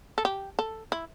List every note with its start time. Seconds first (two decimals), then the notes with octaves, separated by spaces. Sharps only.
0.18 A4
0.25 G4
0.59 A4
0.92 E4